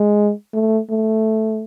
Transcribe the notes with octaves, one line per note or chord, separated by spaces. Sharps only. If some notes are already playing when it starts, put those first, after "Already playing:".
Already playing: G#3
A3
A3